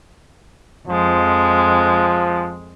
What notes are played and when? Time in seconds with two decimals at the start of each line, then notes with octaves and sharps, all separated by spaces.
0.88 F2 F3 G#3